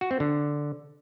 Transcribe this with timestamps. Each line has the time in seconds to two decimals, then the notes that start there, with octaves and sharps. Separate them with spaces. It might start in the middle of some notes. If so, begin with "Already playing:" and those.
0.01 F#4
0.11 C4
0.20 D3